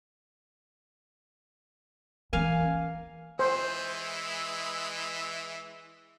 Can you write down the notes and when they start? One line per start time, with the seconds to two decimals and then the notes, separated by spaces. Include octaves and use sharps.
2.33 E3 A#3 C#4 F5 G#5
3.39 E3 G#3 E4 C5